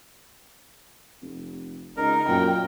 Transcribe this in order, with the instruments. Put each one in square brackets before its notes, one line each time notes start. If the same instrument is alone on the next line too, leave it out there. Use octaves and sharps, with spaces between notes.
[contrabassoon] F1
[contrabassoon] C#2 [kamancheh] D#4 [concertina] A#4
[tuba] F#2 [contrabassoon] A#2 [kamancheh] G5